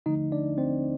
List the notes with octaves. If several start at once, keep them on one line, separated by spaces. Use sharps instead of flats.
D3 F3 A3 D#4 D#5
D4 D5
C4 C5